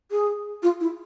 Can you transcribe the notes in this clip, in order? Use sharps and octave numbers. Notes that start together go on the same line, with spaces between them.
G#4
F4
E4